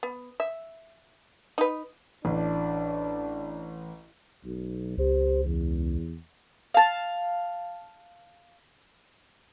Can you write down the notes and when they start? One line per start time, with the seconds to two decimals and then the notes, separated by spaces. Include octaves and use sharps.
0.03 B3
0.40 E5
1.58 D#4 B4
2.25 A1 D4
4.44 B1
4.98 C#2 G4 C5
5.45 E2
6.74 F5 A5